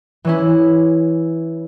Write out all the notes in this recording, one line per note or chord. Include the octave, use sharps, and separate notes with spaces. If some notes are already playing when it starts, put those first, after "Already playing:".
E3 C#4 E4